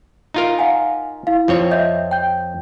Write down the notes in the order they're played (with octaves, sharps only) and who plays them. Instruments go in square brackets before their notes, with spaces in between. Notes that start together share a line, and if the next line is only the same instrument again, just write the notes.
[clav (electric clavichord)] D#4 F4 A#4
[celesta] F5 F#5 G#5
E4 F5
[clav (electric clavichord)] F2 C4 C#5 [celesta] F4
[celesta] D#5 E5 G6
G5 G6